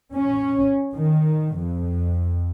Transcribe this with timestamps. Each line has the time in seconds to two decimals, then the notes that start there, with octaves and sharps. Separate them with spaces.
0.13 C#4
0.95 D#3
1.57 F2